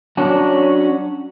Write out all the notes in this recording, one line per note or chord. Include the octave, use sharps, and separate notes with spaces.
F#3 C#4 D4